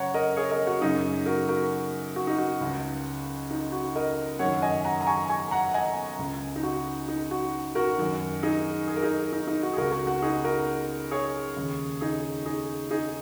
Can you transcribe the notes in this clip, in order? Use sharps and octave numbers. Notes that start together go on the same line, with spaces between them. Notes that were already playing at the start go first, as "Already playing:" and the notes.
Already playing: F#2 C#3 C#5 F#5 A#5
A#4 D#5
G#4 C#5
A#4 D#5
F#4
F#2 C#3 D#4 G#4
F#4 A#4
F#4 A#4
F#4
D#4
F#4
C#2 C#3
D#4
F#4
A#4 D#5
F#2 D#3 C#5 F#5
D#5 G#5
F#5 A#5
A#5
G#5 C#6
G#5 C#6
F#5 A#5
D#5 G#5
C#2 C#3
D#4
F#4
D#4
F#4
F#4 A#4
F#2 D#3
D#4 G#4
G#4
A#4
D#4 G#4
D#4
D#4
F#4
G#4
C#2 C#3 F#4 A#4
F#4 A#4
F#4
D#4 G#4
F#4 A#4
G#4 C#5
D#2 C#3
D#4 G#4
D#4 G#4
D#4 G#4